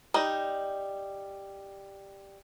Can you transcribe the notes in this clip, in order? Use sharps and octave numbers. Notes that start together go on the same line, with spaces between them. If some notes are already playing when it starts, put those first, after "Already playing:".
G3 D#4